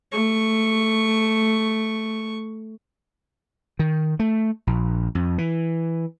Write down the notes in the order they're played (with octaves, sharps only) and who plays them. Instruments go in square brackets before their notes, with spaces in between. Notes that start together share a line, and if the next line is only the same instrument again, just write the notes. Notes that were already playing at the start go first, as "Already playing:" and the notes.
[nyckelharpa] A3 C#6
[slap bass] D#3
A3
A#1
F2
E3